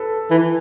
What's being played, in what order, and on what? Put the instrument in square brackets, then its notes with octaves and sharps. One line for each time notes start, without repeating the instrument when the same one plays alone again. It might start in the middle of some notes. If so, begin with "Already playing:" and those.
Already playing: [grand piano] A4 B4
[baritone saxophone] E3